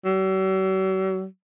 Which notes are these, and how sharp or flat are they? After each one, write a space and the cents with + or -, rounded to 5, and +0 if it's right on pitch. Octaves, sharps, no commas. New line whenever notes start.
F#3 +45